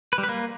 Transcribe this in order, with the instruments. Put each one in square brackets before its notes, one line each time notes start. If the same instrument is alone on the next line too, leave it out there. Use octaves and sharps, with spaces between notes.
[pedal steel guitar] B4
G3
B4
A#3